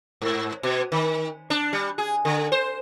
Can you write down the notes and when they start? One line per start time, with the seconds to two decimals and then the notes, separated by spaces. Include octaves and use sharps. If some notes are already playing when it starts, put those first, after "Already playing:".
0.22 G#2
0.63 B2
0.92 D#3
1.50 D4
1.73 G3
1.98 G#4
2.25 D3
2.52 C5